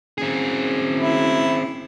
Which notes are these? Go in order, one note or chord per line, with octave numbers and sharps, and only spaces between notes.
F#1 C4 G#4
E4